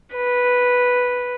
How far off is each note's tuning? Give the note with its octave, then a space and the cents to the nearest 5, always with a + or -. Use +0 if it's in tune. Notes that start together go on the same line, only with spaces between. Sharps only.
B4 -5